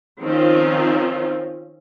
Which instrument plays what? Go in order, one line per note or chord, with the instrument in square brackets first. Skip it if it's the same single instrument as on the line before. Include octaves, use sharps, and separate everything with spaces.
[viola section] D#3 F3 C4 C#4 F4